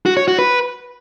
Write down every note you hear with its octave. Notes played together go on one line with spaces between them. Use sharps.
F#4
C#5
F#4
B4